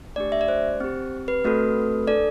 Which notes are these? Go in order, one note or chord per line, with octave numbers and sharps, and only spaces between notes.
A3 D4 G4 D5
E5
D5
C5
C4 G4
B4
A3 C4 F#4 A4
D4 A4 D5